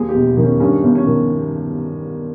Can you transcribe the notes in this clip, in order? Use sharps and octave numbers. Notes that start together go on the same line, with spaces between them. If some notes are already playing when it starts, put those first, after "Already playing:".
Already playing: D#2 G#4
G4
E1
D#3
C#4
G2 C#4
G1
C#4
D#3